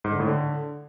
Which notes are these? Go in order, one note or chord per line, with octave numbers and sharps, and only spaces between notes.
G#2
D3
A2
D3